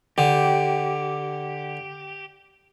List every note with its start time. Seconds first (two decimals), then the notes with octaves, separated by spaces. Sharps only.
0.18 D3 G4